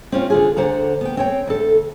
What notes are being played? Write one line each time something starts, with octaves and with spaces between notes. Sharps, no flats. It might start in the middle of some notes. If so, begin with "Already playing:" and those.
C4 C#4 F4
D3 F4 G#4
D2 D3 C5 F#5 A#5
B3 G5
C4 C#5 G5
D2 A4